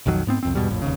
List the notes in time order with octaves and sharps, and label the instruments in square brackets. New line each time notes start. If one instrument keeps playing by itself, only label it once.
[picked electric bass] B1 F2 D#3 F#3
G#2 B3 C4
C2 F2 C4
E2 G#2 B2 G3
A#1 F2 A2
F1 D#2 C#3